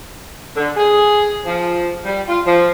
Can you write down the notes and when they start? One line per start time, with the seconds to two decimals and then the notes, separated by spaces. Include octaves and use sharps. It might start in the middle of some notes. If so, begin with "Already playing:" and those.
0.56 D3
0.76 G#4
1.45 F3
2.05 G3
2.28 F4
2.46 F3